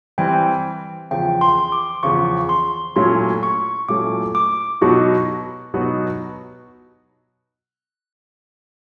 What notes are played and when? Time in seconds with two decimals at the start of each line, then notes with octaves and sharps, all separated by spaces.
0.18 E3 G3 C4 G5
1.11 E2 C#3 F3 G5
1.41 C6
1.72 D6
2.03 E2 C#3 F3 C#6
2.49 C6
2.96 A#2 F#3 A3 C#4 E4 C6
3.43 C#6
3.89 A#2 F#3 A3 C#4 E4 D6
4.35 D6
4.81 B2 F#3 B3 D#4 F#4 C#6
5.74 B2 F#3 B3 D#4 F#4